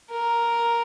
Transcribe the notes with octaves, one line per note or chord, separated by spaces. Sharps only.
A#4